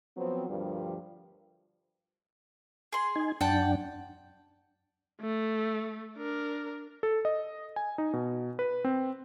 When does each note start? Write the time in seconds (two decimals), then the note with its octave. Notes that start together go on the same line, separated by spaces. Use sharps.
0.17 F3 F#3 B3 C4
0.48 D2 G2 F3 G3 A#4
2.93 G#4 C6
3.16 D#4 G#5
3.41 F#2 D4 F#5 G5 A5
5.21 A3
6.17 D4 A#4
7.03 A4
7.25 D#5
7.76 G#5
7.98 D#4
8.13 B2
8.59 B4
8.84 C4